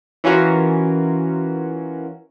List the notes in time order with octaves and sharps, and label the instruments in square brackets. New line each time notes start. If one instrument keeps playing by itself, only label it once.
[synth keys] E3 C#4 F4 F#4 A#4